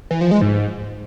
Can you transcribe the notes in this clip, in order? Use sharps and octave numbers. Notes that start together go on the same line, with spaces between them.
E3
F3
G#3
G#2